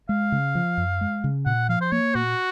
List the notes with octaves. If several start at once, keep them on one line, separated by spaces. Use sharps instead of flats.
G#3 F5
C#3
F3
F#2
G#3
C#3
A#2 F#5
F3 F5
C5
A#3 C#5
A#2 F#4